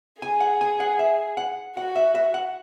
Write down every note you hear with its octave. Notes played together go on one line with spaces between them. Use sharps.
G#4 G#5
F#5
G#5
F#5
E5
F#5
F#4 F#5
E5
E5
F#5